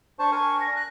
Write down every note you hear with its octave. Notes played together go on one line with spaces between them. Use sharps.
D4 C5 A5 C#6
D4 A#4 G#5
A#6
F#6